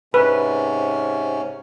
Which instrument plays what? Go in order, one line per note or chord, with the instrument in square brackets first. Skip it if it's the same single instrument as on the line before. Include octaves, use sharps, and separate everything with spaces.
[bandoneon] G#2 C3 C#4 [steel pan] B4